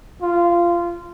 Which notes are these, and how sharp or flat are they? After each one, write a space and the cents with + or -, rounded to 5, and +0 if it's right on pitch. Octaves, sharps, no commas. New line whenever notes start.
F4 -20